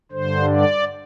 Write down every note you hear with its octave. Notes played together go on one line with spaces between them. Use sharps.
G2 D3 C5
D5